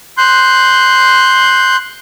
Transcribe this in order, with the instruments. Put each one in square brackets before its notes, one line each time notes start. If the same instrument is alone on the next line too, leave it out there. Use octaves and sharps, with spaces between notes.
[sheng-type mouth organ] C6 F#6 G6